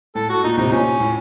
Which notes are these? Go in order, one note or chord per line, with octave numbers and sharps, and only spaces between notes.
A2 A4
F#4
A#2 D#4
A2 C3 D#4
A#2 C#4
A2